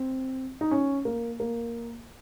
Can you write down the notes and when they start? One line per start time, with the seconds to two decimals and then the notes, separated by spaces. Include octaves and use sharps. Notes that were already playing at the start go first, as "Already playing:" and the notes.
Already playing: C4
0.61 D#4
0.71 C#4
1.05 A#3
1.40 A#3